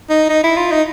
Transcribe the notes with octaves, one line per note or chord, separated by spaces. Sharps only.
D#4
D#4
E4
F4
D#4